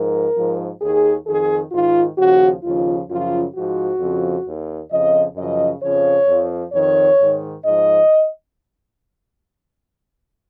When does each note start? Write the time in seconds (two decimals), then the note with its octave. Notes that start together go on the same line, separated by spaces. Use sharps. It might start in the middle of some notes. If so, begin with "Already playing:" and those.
Already playing: G#2 F3 A#4
0.36 G#2 F3
0.81 D#2 D#3 G#4
1.27 F2 D#3 G#4
1.72 G#2 D#3 F4
2.18 D#2 C#3 F3 F#4
2.63 D#2 C#3 F3 F4
3.09 F#2 C#3 F3 F4
3.55 G#2 F3 F#4
4.00 F2 C#3 F3
4.46 D#2 D#3
4.90 F2 C#3 F3 D#5
5.36 F#2 C#3 F3 D#5
5.82 F2 C#3 F3 C#5
6.28 F2 F3
6.73 F2 D#3 C#5
7.19 G#2 D#3
7.64 G#2 F3 D#5